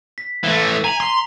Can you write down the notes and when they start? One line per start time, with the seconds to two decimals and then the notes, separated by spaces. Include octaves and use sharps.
0.18 B6
0.44 E3 A3
0.84 G#5 A#5 F7 F#7
1.00 C6